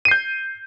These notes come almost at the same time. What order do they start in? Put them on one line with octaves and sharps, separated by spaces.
D#7 C7 G6